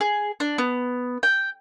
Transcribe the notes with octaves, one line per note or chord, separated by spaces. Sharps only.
G#4
D4
B3
G5